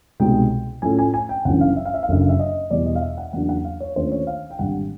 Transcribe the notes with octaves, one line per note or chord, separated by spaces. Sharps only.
C2 B2 G#3 C4 D#4 G5
A2 F3 A3 C#4 G#5
G#5
G#5
G5
G1 F#2 C#3 E3 F#5
F5
E5
F5
E5
F5
F#1 F#2 D3 E5
F5
E5
D#5
E2 B2 G3 B3 D5
D#5
F5
E5
F#5
E2 C#3 F#3 A#3 D4 F#5
F#5
F5
C#5
D#2 D3 F3 A3 C#4 C5
C#5
F5
G5
G#1 G2 D3 G3 F#5